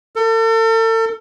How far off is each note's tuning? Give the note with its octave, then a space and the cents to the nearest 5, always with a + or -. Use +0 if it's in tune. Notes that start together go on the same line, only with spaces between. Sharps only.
A4 +40